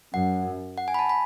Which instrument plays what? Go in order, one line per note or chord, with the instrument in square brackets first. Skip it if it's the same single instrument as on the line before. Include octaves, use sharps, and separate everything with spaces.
[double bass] F#2 [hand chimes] F#5
[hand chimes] F#5
G#5
B5
A5
B5